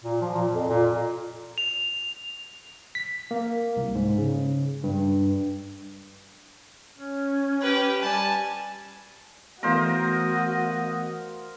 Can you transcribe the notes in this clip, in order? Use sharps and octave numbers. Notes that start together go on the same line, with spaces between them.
A#2
F3
A#2
F2
A#2
F7
B6
A#3
C2
G#2
C#3
G2
C#4
G4 B4
G3 G#5 A5
E3 A3 B3 F#4 A#4 C5 D#5 F5